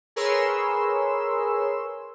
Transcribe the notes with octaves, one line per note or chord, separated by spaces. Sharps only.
G#4 A#4 B4 C#5 C6 E6